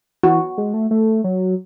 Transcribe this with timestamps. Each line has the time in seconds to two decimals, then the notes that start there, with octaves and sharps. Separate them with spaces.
0.23 E3 F#4
0.58 G#3
0.74 A3
0.91 A3
1.24 F#3